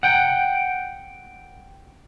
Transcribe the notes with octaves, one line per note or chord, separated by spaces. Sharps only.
F#5 G5